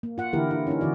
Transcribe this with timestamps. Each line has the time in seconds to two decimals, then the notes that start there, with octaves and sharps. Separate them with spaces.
0.03 A#3
0.18 F4 F#5
0.33 D3 E3 A#3 E4 G4 A#4
0.51 E4
0.67 C#4 D#4 A#4
0.81 D3 E3 F#4 D5